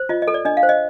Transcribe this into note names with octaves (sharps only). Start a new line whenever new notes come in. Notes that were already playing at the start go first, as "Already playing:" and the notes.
Already playing: C5
F4 D#5
D#5
A4
D5
D4 D#5
F5
C5
D#5